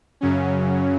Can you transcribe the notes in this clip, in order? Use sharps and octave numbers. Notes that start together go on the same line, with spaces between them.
F#2 C#3 F#3 C#4